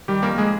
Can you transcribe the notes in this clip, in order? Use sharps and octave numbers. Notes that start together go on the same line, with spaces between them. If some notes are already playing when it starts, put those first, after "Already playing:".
D#3 G3 G4
F2 A#3 A#4
G#3 G#4